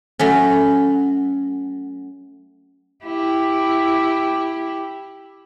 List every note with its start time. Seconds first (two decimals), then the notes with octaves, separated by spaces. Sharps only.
0.19 F#3 A3 C#4
3.05 E4 G4